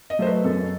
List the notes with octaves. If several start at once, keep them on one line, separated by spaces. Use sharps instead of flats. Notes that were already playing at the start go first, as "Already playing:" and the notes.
D#5
F#3 A3 C5
B4
F#2 A4